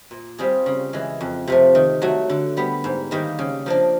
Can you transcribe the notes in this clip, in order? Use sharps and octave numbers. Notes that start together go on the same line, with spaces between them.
A#2
G3 C4 F4 G#4
C#3
E3 G#3
F2
C3 F3 A3
D#3
F#3 A3
D3
G3 B3
G#2
D#3 G3 A#3
C#3
F3 A#3 D4